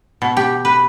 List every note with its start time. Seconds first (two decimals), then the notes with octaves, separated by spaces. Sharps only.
0.22 B2
0.37 G4
0.65 B4